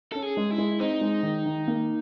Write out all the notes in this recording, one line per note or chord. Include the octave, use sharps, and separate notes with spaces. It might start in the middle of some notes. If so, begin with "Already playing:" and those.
C#4 A4
G#4
G#3
E4
G#3
C4 D#4
G#3
D#3
D#3
A#3